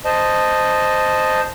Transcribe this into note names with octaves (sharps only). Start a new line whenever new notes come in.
C5 D#5 A5